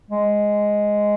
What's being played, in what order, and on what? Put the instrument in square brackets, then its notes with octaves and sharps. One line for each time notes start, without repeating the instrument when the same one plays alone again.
[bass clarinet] G#3